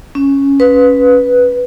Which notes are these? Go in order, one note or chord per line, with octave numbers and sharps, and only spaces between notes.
C#4
B4